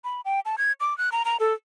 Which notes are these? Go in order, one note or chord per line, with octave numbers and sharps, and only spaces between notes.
B5
G5
A5
G#6
D6
F#6
A#5
A#5
A4